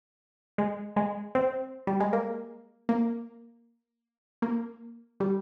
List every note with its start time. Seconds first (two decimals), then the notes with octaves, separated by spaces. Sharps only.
0.58 G#3
0.96 G#3
1.35 C4
1.87 G3
2.00 G#3
2.13 A#3
2.89 A#3
4.42 A#3
5.20 G3